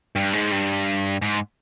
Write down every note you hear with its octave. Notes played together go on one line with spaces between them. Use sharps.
G2
G#2
G2
G#2